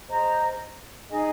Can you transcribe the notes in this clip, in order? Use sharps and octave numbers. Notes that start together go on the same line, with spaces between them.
G#4 C5 D#5 A#5
D#4 G#4 D#5 G#5